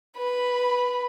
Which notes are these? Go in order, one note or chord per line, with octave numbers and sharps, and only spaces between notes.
B4 B5